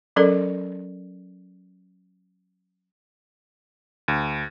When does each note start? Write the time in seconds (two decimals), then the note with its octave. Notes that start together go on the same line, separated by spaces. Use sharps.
0.16 F#3 C#4 A4 A#4 D5
4.08 D2